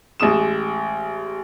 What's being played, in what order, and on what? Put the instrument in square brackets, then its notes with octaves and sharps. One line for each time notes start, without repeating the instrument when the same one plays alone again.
[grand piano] A1 G#3 D#6 E7